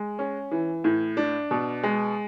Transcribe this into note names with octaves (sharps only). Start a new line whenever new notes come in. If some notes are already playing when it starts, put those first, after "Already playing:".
Already playing: G#3
C#4
E3
A2
D4
B2
G#3